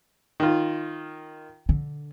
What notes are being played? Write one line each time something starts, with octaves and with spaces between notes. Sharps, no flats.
D#3 F4
D3